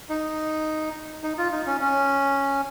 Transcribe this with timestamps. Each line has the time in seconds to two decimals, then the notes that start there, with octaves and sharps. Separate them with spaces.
0.09 D#4
1.23 D#4
1.38 F4
1.52 D#4
1.67 C#4
1.81 C#4